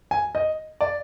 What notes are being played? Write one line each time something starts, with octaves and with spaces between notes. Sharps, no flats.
G#5
D#5
D5